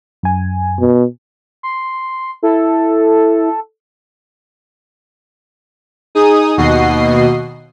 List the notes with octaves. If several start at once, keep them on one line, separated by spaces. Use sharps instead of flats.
F#2 G#5
B2
C6
E4 A4
D#4 G#4 D#6
D#2 B2 F#4 D#5 C7